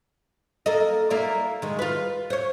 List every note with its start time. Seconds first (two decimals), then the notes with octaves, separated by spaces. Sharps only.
0.66 A#3 A4 D#5
1.10 A#3 E4 D5
1.62 D#3 G#3
1.79 F4 B4
2.30 C5 C#5